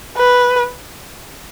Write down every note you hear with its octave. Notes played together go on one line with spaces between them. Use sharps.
B4